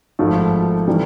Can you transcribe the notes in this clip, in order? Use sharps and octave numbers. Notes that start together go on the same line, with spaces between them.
G#1 G#2 F3 A3
C3 E3 G3